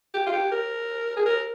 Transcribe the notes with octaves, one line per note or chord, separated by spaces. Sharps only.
G4
F4
G4
A#4
G#4
A#4